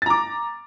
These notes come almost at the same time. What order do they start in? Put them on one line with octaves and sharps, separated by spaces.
A6 A#5 D6